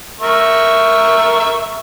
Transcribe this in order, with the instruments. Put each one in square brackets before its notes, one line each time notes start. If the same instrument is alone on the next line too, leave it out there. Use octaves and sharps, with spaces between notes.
[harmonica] A#4 E5 C#6